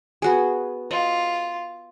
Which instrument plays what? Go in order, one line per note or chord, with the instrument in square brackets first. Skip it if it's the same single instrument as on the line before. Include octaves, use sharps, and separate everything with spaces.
[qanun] B3 F#4 G#4
[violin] F4 [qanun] D#5